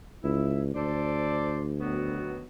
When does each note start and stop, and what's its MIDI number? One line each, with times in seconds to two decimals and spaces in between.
0.24 0.70 37
0.24 0.61 64
0.75 2.45 38
0.75 1.64 69
0.75 1.64 72
0.75 1.64 74
1.80 2.47 51
1.80 2.47 54
1.80 2.47 59